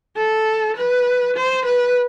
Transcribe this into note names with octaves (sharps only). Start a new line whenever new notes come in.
A4
B4
C5
B4